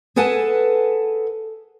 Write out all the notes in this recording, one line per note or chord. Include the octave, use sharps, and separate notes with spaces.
G#4 A4 B4 F#5 G#5 A5